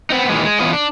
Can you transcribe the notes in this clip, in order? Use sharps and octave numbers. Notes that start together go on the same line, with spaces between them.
B3 C4 D#4
A#2 D#3 E3 G#3
G#3
E3 B3 C#4 F4 D#5
D4